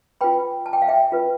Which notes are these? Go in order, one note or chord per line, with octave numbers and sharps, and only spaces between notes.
F4 B4 G5 B5
A5
G5
F5
E5 G5
F4 B4